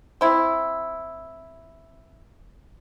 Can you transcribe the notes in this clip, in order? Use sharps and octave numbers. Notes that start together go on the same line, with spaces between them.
C4 E4